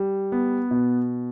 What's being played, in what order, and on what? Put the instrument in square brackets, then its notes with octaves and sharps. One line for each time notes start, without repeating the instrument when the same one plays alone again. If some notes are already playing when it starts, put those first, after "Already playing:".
Already playing: [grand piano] G3
B3
B2